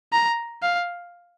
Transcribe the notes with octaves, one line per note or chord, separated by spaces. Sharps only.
A#5
F5